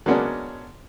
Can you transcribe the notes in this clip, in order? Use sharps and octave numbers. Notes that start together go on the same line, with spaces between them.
F#3 G#3 A#3 B3 C#4 D4